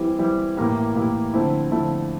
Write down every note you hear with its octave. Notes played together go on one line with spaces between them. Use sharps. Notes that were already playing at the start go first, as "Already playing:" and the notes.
Already playing: E3 G3 C4 E4 G4
E3 G3 C4 E4 G4
A2 E3 A#3 E4 G4
A2 E3 A#3 E4 G4
D3 F3 A3 C4 E4
D3 F3 A3 C4 E4